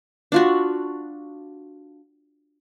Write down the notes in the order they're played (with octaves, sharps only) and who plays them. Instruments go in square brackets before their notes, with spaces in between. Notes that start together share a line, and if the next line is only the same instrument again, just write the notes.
[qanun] D4 F4 F#4